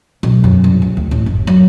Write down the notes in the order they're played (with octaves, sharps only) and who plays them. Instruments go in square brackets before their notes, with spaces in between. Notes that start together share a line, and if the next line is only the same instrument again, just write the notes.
[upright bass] B1
F#2
C2
C#2
D2
A1
F#1
F#3